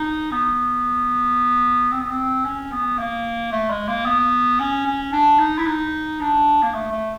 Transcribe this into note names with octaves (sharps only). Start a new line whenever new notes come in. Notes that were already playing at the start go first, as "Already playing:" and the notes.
Already playing: D#4
B3
C4
B3
C4
C#4
B3
A#3
A3
G#3
A#3
B3
C#4
C#4
D4
D#4
E4
D#4
D4
A#3
A3
A3